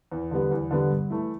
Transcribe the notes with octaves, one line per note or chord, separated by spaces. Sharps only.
E2
D3 G3 B3
E2
D3 G3 B3
G2
E3 A3 E4